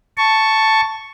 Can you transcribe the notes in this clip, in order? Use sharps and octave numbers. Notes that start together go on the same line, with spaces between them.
A5 C#6